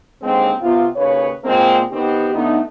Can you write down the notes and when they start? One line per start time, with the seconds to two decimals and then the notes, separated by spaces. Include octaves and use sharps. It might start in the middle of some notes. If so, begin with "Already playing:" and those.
0.22 D#2 D3 G#3 C4
0.61 C3 B3 F4
0.95 D#2 C#3 B4 C#5
1.44 A#2 G#3 A#3 C4
1.91 D#3 B3 C4 G4
2.33 D3 A3 B3 D#4